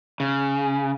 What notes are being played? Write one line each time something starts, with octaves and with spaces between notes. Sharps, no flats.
C#3